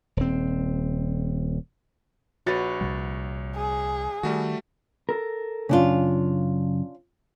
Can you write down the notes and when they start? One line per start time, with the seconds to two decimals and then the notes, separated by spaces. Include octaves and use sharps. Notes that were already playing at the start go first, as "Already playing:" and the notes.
0.17 D#1 C4
2.46 A#1 F#4 B4 C#5 A6
2.81 C2 C3 G3
3.56 G#4
4.23 D#3 G3 A3 F#4
5.09 A4 A#4
5.69 F#2 C#3 C#4 D4 F4